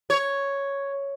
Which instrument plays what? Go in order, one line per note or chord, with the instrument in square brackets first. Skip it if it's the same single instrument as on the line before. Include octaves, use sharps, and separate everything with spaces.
[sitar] C#5